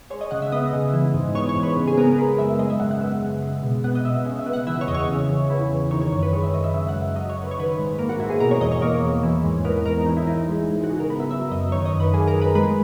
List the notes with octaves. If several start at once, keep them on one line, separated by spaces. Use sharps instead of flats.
G#3 C#5
D#5
C#3 F#5
E5
B3 D#5
C#3
E3
G#2
B3 C#5
C#5
G#2
B4
C#3
G#4
B3 A#4
A#4
G#3 B4
F#2 E5
G#3 D#5
E5
C#3 F#5
F#5
B3 E5
C#3
G#3
B2
B3 F#5
D#5
B2 E5
C#3
E5
B3
F#5
E3 E5
C#5
E2 D#5
C#5
C#3
E2
E3
E2
D#3 C#5
C#5
F#2 C#5
B4
G#3 C#5
E5
F#2 D#5
E5
C#3 E5
F#5
F#2
E5
F#3 D#5
C#5
F#2
B4
C#5
D#3 B4
G#2
A#3 A#4
F#4
G#2 E4
G#4
B2 A#4
C#5
E2 D#5
C#5
A#3 C#5
E2
E3
G#2
B3 A#4
G#2 A#4
E3 D#4
E4
G#2 D#4
D#4
G#3
G#2
F#4
C#3 G#4
A#4
B3 B4
E5
F#3 E5
F#2 D#5
D#3 C#5
D#5
F#2
B4
A#3 G#4
A#4
F#2
B4
G#3 B4